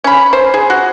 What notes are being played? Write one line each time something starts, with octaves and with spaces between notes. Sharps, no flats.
C#4 B5
C5
G#4
F#4